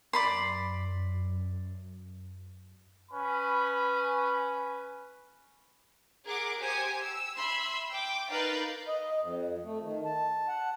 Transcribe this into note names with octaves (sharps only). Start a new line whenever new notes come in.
F#2 D5 B5 C6
C#4 B4 B5
G#4 A#4 F#5 D6
G4 C5 G#5 D#6 C#7
E6
E5 B5 C6 E6
G5 D6
D#4 A#4 B4 F5 G6 A6
D#5
F2
A3
D#3
A5
F#5